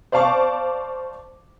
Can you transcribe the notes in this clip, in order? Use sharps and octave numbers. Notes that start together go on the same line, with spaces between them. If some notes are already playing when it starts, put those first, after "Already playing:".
C5 D5 F5 A5 C#6 D6